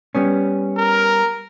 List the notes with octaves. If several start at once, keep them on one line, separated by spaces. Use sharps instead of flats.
G3 B3 C#4
A#4